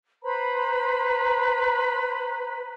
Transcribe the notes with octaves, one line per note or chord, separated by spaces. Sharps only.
B4 C5 A#5 B5